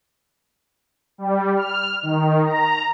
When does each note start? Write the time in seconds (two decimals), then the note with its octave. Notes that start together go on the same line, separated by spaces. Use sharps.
1.18 G3
1.56 F6
2.03 D#3
2.44 A#5